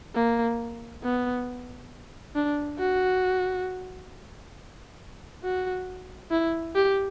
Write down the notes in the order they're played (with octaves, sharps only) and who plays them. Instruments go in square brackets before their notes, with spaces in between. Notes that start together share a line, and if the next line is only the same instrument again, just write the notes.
[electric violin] A#3
B3
D4
F#4
F#4
E4
G4